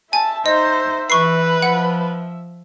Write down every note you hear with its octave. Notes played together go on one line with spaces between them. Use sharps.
E5 G#5 A5
D#4 C5 D#5
E3 B4 C#6 C7
F3 F#5